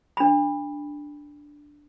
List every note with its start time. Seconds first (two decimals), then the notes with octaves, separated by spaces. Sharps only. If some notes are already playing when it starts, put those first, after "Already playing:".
0.17 D4 B5